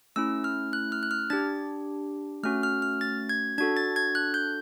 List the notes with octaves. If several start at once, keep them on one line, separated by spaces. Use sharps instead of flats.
A3 C#4 E4 E6
F6
F#6
F6
F#6
F6
D4 G4 A6
A3 C#4 F#4 F6
F6
F6
A6
G#6
D4 F#4 A4 G#6
A6
G#6
F#6
G6